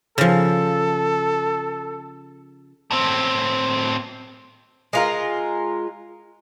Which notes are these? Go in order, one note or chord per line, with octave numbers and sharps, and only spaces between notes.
C#3 F3 A4
A2 C4
G#3 F4 A#4